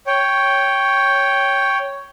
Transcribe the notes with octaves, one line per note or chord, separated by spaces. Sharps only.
C#5 G5